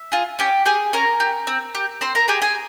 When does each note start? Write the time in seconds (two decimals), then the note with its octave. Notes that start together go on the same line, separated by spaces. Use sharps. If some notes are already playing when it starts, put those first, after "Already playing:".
Already playing: E5
0.12 F4 G#4
0.39 C#4 G4 G5
0.66 G4 G#4 G#5
0.93 C#4 A#4 A#5
1.20 G4
1.47 C4
1.75 G4
2.01 C4 C5 C6
2.15 A#4 A#5
2.28 G4 G#4 G#5
2.42 G#4 G#5